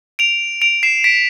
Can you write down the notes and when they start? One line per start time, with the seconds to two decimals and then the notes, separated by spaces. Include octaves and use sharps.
0.19 D7 F7
0.62 D7 F7
0.83 C7 E7
1.04 B6 D7